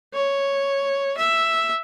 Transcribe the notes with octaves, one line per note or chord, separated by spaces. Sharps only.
C#5
E5